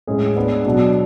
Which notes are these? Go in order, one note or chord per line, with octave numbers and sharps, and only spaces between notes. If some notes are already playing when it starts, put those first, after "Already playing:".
A2 G#3 C#4 G#4
G#3 B3 D4
B2 F#3 B3 D4